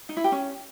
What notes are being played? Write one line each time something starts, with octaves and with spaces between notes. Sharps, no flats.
D#4
E4
G4
C#4